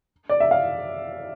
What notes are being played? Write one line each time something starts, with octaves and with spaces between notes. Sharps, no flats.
D5
E5
F5